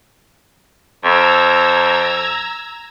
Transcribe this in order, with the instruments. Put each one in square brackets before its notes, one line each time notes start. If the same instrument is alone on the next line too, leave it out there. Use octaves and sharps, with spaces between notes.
[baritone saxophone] F2 [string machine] A#5 E6 G#6